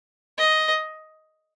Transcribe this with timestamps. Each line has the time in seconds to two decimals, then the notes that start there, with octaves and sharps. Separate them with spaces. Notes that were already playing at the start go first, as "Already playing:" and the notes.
0.38 D#5